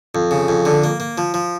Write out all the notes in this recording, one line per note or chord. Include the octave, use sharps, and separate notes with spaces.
F2
C#3
F2
D3
A#3
A#3
F3
F3